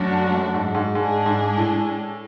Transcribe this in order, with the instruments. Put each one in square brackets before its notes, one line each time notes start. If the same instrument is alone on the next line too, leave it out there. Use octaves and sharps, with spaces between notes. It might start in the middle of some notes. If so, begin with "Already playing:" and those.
Already playing: [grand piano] F#2 [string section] F#3 A3 D4 F#4
[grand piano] F#2
G#2
G#2
[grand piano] G#2 [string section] G#3 D4 G#4
[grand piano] G#2
A2